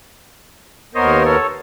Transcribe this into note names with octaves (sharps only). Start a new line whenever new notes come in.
D#2 B3 A#4 C5 C#5 D#5
A4 C#5